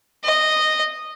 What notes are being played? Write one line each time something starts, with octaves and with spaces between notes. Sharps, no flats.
D#5